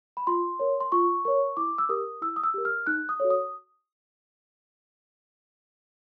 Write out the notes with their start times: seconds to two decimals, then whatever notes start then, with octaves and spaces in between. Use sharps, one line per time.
0.17 B5
0.27 F4 C6
0.59 A#4 C#5
0.80 C6
0.92 F4 C#6
1.25 A#4 C#5 C#6
1.57 E4 D6
1.78 E6
1.89 G4 A#4 D#6
2.22 E4 E6
2.36 D#6
2.44 E6
2.54 G4 A#4
2.65 F6
2.87 D#4 F#6
3.09 D#6
3.20 F#4 A4 C#5
3.30 D#6